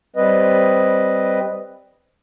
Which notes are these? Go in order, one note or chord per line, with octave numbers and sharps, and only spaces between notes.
G3 C4 B4 D#5